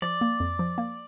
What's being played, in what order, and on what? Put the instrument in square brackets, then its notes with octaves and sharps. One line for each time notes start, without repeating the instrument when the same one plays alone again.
[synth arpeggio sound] F3 [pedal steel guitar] D5
[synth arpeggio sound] A#3
F2
F3
A#3